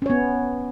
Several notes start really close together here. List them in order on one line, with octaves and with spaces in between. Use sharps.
C#4 C#5 B3